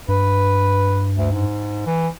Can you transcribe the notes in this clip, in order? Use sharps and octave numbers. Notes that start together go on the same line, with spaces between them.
G2 B4
D2
G#2
E3